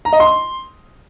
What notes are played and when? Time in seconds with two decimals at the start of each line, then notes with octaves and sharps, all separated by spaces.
0.05 A#5
0.13 D#5
0.20 C6